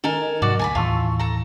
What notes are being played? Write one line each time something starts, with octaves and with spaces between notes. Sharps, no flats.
D#3 A4 A#4 G#5
G#2 C3 F#3 F#4 D5 F#5
D2 G#5 A5 B5
D#2 A2 E3 F4 A5 C#6 E6
A4 A#5